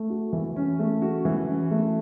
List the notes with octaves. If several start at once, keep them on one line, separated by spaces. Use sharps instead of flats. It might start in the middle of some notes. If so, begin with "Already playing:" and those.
Already playing: A3
F#4
E3
C#4
A3
F#4
E3
C#4
A3